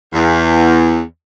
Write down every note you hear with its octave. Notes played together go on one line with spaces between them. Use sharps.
E2